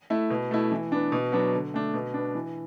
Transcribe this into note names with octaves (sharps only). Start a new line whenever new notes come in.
A3 E4
B2
A3 E4
E3
B3 D4
B2
F#3 B3 D4
D3
A3 D4
B2
B3 D4
E3